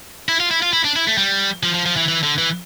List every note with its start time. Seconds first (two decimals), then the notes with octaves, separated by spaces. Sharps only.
0.29 E4
0.40 F4
0.51 E4
0.62 F4
0.73 E4
0.84 D4
0.96 E4
1.07 A3
1.18 G3
1.63 F3
1.74 F3
1.86 F3
1.97 E3
2.08 E3
2.23 D3
2.38 E3